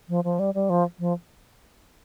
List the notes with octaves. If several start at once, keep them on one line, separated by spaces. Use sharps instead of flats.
F3
F3
G3
G3
F3
F3